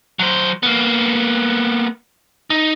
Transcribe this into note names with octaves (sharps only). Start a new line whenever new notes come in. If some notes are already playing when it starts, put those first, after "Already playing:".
F#3 C5
A#3 B3
D#4